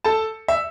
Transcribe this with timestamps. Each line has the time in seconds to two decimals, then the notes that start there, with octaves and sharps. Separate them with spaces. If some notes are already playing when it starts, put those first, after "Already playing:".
0.04 A4 A5
0.48 E5